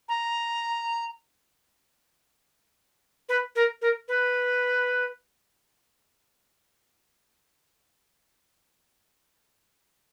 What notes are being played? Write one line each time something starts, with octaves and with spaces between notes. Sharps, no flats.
A#5
B4
A#4
A#4
B4